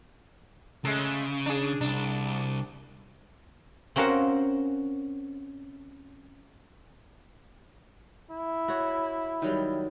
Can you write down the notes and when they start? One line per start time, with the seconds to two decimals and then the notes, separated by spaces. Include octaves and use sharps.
0.85 C#3 G#3 A3
1.46 D4 G#4
1.81 C2 D4
3.96 C4 C#4 F#4 A#4 F5 F#5
8.31 E4
8.68 F#4 C#5
9.42 D#3 F#3 G3